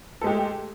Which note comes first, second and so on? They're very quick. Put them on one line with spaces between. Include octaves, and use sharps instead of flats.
A4 G#3 G4 A3